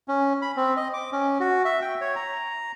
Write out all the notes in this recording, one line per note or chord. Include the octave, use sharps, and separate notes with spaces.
C#4
B5
C4
D#5
D6
C#4
F#4
E5
G5
C#5
A#5